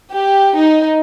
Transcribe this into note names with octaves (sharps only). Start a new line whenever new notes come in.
G4
D#4